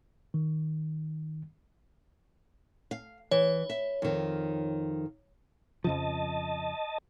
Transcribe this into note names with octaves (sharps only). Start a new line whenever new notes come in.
D#3
F5
E3 C#5
E5
F2 D#3
F2 C#3 F3 D#5 A5